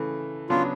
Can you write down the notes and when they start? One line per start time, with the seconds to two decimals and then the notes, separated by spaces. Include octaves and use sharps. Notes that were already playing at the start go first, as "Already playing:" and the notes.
Already playing: C#3 E3 A3
0.49 C#3 F#3 B3 D4 F4